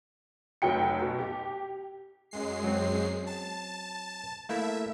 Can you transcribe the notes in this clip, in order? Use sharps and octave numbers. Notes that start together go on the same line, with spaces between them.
F1 F#3 G5 C#7
B2
G4
F#2 G#3 C7
F#3 C4
A5
A3 A#3 E4 E5